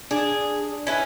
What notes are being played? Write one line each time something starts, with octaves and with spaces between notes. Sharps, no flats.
D4 G#4
C#4 E4 B4